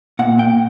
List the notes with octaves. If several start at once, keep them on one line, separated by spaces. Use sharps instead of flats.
A#2 F#5
A#2 G5